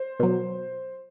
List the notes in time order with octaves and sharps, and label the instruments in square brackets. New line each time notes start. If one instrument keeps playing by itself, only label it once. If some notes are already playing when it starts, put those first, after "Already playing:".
Already playing: [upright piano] C5
[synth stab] B2 F#3